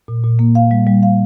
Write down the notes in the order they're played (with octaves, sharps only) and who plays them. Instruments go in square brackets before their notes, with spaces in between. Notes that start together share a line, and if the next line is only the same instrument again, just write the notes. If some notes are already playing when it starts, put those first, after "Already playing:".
[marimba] A#2
A#2
A#3
F5
G3
G3
F5